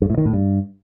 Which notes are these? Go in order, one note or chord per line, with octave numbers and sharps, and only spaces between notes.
G2
A2
D#3
A2
G2